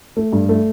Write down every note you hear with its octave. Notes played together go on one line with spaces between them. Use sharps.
A3
G2
A3